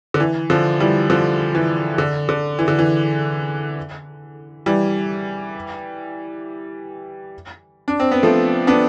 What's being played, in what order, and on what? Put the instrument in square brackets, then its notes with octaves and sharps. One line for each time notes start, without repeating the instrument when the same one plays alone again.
[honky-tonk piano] D3
E3
D3 F3
E3 G3
D3 F3
E3
D3
D3
E3
D3
E3
E3 G3
D4
C4
B3
F3 A3
B3 D4